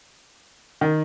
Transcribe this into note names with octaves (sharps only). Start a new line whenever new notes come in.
D#3